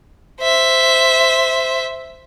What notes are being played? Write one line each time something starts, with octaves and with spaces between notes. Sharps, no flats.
C5 E5